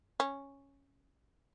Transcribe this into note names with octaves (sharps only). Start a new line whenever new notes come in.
C#4